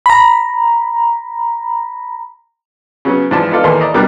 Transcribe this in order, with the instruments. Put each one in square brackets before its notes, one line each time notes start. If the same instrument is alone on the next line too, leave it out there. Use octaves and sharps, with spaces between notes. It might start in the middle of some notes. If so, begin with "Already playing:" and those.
[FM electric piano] A#5 B5
[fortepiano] C#3 F#3 B3 C#4
G#2 E3 F3 D5 A5 C6
B3 D#4 F4 A4 D5 F5
A1 D#2 A2 E3 A#4 C6
D5 D#5 A#5
B2 G3 D4 A#4 D6 F#6